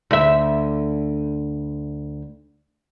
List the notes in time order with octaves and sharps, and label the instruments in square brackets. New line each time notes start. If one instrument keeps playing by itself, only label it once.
[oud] D2 E5